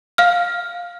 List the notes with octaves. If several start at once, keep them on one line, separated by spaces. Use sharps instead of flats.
F5 F6